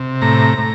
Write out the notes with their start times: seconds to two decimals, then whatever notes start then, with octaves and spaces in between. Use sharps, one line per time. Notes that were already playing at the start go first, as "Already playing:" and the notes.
Already playing: C3
0.22 A2 A#5
0.58 A2